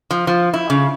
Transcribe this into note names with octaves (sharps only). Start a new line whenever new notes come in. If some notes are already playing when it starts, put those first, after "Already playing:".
F3
F3
E4
C#3